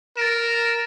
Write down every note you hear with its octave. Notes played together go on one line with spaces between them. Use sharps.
A#4 A6 D7 E7